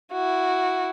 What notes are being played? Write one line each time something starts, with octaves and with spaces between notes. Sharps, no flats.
E4 F#4